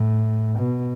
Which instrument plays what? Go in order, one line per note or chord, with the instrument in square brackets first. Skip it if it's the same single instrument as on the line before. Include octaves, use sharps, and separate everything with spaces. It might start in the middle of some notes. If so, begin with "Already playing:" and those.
Already playing: [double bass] A2
B2